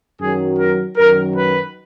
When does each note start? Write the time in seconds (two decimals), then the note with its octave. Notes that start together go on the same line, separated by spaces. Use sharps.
0.19 F#2 D#3 F#3 G#4
0.57 A#4
0.97 F#2 D#3 F#3 A#4
1.35 B4